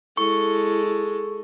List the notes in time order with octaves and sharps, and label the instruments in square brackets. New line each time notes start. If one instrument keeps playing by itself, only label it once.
[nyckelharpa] G#3 A4 [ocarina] E4 [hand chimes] C#6